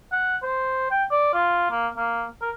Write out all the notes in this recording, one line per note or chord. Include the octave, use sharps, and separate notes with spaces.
F#5
C5
G5
D5
F4
A#3
A#3
A#4